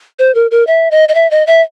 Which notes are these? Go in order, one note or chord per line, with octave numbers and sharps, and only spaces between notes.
C5
A#4
A#4
E5
D#5
D#5
E5
D#5
E5